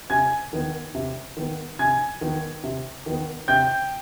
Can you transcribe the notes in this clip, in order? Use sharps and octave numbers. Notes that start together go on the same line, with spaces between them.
C3 G#5 G#6
D#3 B3
C3
D#3 B3
C3 G#5 G#6
D#3 B3
C3
D#3 B3
C3 G5 G6